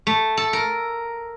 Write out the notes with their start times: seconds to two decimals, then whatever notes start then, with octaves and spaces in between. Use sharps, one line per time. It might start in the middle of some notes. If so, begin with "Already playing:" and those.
0.07 A3
0.37 A4
0.53 A#4